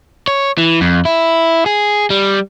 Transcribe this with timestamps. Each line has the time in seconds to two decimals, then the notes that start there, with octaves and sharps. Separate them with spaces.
0.28 C#5
0.58 E3
0.81 F2
1.05 E4
1.66 G#4
2.10 G3